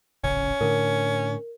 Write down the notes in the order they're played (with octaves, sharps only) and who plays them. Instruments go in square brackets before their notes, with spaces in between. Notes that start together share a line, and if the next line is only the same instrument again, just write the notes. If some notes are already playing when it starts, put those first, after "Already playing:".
[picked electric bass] D1 G#1 C#3 [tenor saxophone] C#4
[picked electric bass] A2 D3 [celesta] A#4